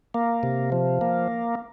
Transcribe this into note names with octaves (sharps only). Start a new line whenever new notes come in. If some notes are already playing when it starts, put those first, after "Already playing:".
A#3
C3
F3
A#3